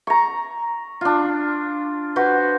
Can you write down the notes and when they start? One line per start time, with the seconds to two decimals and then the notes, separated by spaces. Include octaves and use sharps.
0.07 A#5 C#6
1.01 D4 F4
2.16 F#4 B4 C5